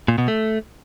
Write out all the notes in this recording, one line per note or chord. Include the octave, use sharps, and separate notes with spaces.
A#2
B2
A3